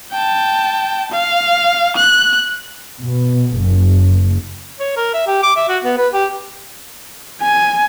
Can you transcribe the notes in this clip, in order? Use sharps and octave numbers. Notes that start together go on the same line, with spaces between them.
G5 A5
F5
F#6
B2
F#1
C#5
A#4
E5
G4
D6
E5
F#4
B3
B4
G4
G#5